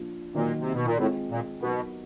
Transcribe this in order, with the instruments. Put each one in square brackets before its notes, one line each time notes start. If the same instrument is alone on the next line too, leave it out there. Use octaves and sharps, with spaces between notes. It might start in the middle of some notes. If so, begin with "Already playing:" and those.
Already playing: [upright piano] F3 A#3 D4 F4
[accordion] A#2 [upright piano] D#3 F#3 A#3
[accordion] C3
B2
A#2
[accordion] A2 [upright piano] G#3 C4 F4
[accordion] A#2
[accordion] B2 [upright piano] F#3 B3 D#4 F#4 A#4